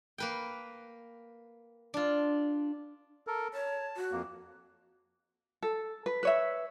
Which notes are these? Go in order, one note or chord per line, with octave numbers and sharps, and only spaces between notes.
A#3 B4 G5
D4 F4
A4 A#4
C#5 A5
F#4
F2 A#3
A4
B4
B4 C#5 E5